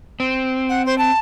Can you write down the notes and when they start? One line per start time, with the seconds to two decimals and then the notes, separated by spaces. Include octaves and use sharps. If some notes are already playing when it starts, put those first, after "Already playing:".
0.20 C4
0.69 F#5
0.86 C5
0.98 A5